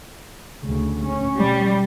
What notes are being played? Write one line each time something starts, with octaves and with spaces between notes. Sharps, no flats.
D2 C#3
C#4
B2 G3